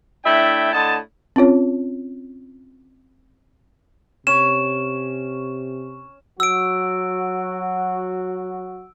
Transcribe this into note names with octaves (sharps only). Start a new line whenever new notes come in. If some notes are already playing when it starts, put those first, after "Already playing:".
A2 D4 E4 E5 G5
A2 D3 D#5 A5
C4 C#4 F4 C#5
C3 C#4 E7
F#3 F#4 E6 D7